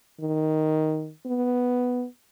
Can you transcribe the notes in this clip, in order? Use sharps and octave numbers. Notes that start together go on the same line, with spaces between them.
D#3
B3